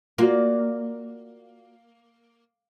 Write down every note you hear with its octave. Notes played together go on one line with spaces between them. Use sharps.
A#3 F4 F#4 D5